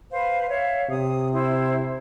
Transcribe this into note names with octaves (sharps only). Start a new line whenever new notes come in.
B4 C5 F5
C#5 E5 F5
C3 D#6
E4 C5